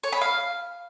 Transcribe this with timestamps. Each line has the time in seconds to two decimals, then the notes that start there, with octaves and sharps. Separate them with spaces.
0.04 C#5
0.12 B5
0.21 F5